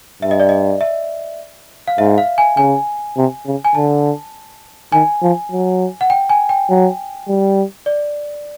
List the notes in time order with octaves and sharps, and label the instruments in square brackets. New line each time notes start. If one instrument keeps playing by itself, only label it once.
[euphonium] G2 [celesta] E5
[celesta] D#5
D5
D#5
E5
F5
[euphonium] G#2 [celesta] E5
[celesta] F5
G#5
[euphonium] C#3 [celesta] G#5
[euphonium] C3
C#3
[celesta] G#5
[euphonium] D3 [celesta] A5
[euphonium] D#3 [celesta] G#5
[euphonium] F3
F#3
[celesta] F#5
G5
G#5
G5
[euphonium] F#3
G3
[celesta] D5